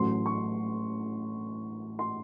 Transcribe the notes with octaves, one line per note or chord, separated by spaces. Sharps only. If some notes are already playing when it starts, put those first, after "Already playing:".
Already playing: A1 A2 F#3 A3 C6
C#6
C6